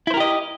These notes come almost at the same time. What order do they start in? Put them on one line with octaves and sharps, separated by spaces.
E4 C5 A#4 G4 D#5